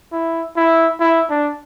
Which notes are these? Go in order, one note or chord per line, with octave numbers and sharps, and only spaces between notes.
E4
E4
E4
D4